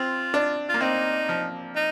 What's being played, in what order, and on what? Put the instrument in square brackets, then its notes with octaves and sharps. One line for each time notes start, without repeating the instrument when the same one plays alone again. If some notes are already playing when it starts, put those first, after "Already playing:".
Already playing: [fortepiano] C4 [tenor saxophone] F4
[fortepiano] D4
[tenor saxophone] F4
[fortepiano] A#3
[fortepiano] C4 [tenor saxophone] D#4
[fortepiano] F3
[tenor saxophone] D#4